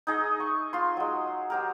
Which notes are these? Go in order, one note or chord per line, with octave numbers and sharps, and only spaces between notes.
D#4 G#4 D#5 E5
C#6
F4 C6
F#3 G#3
F#3 G4 A#4